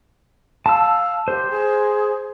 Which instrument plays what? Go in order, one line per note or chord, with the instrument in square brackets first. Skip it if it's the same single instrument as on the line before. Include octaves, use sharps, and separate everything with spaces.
[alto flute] F5 [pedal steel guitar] A5 E6
[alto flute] G4 [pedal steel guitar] C5
[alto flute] G#4